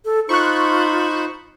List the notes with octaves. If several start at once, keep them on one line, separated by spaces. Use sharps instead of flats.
A4
D#4 F4 C5 B5 C#6 F#6